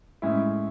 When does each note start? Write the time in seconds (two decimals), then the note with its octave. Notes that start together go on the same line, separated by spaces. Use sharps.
0.22 A2 G#3 C#4 E4